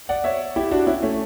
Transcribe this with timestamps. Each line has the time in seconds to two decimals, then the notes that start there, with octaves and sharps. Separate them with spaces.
0.09 D5 F#5
0.24 C#5 E5
0.56 E4 G4
0.71 D4 F#4
0.87 C#4 E4
1.02 A3 C#4